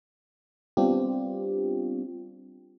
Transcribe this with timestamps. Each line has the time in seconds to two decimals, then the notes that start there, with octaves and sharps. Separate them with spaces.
0.77 G3 B3 C4 D4 F4 G4